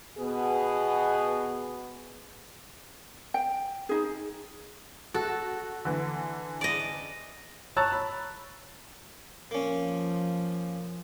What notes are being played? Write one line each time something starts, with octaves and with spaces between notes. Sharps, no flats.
B2 B3 G#4
G5
D#4 G#4
F#4 A4
D3 E3
D5 D#5
C#5 A5 A#5 E6 F#6 A6
B5
F3 A#3 C#4